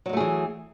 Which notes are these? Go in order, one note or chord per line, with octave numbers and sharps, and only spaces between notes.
E3 F#3 G#3 A3 G#4